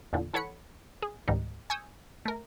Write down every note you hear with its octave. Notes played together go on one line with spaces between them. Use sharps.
E2 A#2 D3
E3 A4 C#5 F#5 B5 C#7
G#4
C#2 G#2 D#3 G3 D#4
G#5 C#6 D#6 E6 G6
A3 A#4